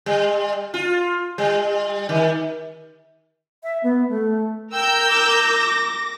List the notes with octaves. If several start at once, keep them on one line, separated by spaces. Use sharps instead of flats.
G3
F4
G3
D#3
E5
B3
A3
A#4 G5 E6 G6
D6 A#6